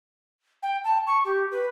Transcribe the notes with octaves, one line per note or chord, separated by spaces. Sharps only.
G5
A5
C#6
G4
B4